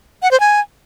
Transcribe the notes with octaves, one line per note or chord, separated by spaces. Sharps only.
F#5
C5
G#5